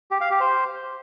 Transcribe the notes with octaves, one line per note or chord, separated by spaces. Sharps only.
G4
F5
G4
C5